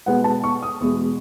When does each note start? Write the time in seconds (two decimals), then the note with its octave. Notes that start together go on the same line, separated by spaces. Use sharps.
0.06 B2 G#3 B3 F#5
0.24 A5
0.44 C#6
0.63 D#6
0.81 E2 B2 G#3